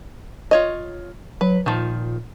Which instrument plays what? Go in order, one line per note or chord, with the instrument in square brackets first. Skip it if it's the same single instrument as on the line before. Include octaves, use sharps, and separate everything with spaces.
[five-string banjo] F4 C#5 D#5
[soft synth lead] F#3 [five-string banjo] B4
[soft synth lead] A#2 [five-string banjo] D#3 F3